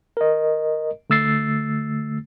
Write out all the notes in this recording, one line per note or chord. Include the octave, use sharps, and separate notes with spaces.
A#4 D#5
D3 A3 E6 A6 C7